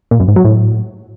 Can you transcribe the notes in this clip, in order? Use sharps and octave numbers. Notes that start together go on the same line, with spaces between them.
A#2
F#2
G#2
F#3
A2